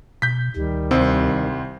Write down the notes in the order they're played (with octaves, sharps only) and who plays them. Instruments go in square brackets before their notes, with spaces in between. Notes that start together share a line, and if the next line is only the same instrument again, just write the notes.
[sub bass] B2 [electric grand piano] G6 B6
[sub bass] D2 [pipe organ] D#3 G3
[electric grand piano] C2 C4